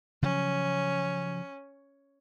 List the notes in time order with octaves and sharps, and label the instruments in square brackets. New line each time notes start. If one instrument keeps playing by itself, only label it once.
[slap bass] C#3 F3 F#3 [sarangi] C#4